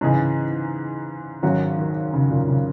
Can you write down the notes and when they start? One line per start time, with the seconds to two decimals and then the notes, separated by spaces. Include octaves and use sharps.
0.01 G#2 C#3 E3 G#3 D#4 G#4
1.43 G#1 G#2 D#3 F#3 C#4 F#4
1.78 D#3
2.14 C#3
2.31 A#2
2.48 C#3